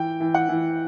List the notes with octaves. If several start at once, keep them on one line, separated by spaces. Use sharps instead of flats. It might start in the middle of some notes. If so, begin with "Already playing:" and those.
Already playing: E3 G5
E3
F#5
E3